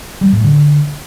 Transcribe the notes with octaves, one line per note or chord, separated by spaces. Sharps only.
G3
A2
D3